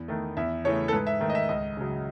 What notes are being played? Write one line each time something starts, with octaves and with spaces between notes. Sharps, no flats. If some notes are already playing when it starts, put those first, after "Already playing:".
Already playing: E2
D#3 A3
E2 E5
C#3 E3 A3 C#5
A4
G#2 B4
E5
D#3 A3
D#5
E5
C#2 D#5
C#3 F#3